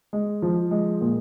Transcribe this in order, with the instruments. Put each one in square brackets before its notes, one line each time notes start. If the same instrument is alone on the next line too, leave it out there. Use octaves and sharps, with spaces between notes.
[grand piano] G#3
F3
G#3
A#2